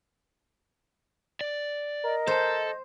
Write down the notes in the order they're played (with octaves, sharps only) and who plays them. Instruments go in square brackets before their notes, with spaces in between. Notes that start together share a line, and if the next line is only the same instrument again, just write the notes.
[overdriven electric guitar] D5
[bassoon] A#4 [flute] D#5
[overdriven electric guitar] A4 A5 [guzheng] C5